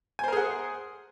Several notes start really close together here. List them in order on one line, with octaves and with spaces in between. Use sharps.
G#5 C5 A#4 G#4 F#5